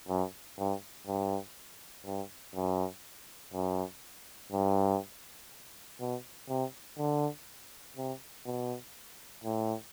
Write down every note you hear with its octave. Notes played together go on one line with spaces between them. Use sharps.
F#2
G2
G2
G2
F#2
F#2
G2
B2
C3
D3
C3
B2
A2